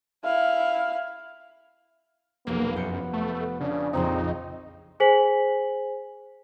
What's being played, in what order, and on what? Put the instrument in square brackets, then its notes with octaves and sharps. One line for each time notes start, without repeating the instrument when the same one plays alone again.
[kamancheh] E4 F5
[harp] F1 B1 D6 [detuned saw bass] A#3 [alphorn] B3
[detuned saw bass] F#2 [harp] C5 C#7
[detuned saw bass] A3
[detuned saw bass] C#3 [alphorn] D4
[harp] A#1 F2 C#3 [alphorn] C4 [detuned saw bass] D#4
[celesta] G#4 C5 G#5 B6 F#7